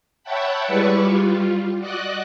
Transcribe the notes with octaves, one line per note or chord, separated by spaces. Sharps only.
C#5 E5 F#5 G5 A5 B5
G3 G#3 E4 B4 D5 C#6
G3 F4
F#4 D5 D#5 F#6